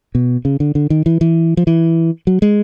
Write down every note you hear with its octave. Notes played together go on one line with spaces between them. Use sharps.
B2
C#3
D3
D3
D#3
E3
E3
F3
E3
F#3
G#3